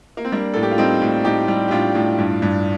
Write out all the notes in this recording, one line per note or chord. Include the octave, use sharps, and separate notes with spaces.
A#3
C4
G3 A#3 D4
A2 A4
G4
F4
G3 C4 D#4
A2
A2 D#4 G4
G3
G4
A2 D4 F4
A2
G2
G2